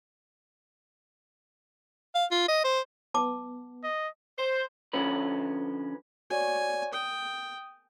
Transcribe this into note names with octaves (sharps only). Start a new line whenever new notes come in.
F5
F4
D#5
C5
B3 A5 D6
D#5
C5
D3 F3 C#4 B4
F#4 C#5 D5 G#5
G5 D#6